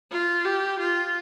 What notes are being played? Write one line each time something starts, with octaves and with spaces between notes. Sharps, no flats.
F4
G4
F4